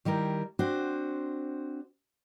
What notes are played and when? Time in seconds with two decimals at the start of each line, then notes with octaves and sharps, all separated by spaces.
0.05 D#3 G3 E4 A#4
0.59 C4 D4 F#4 C5